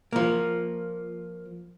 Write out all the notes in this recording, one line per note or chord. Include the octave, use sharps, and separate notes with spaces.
F3 A#3